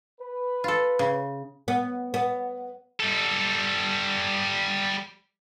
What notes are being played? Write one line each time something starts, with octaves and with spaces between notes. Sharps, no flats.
B4
F4 A4
C#3
B3
B3
G3 A4